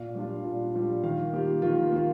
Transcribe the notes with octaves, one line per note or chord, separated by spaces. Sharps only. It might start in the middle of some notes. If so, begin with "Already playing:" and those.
Already playing: A#2 F5
G3 D4 F4
A#2
G3 D4 F4
D#3 F5
A#3 F4 G4
D#3 F4
A#3 F4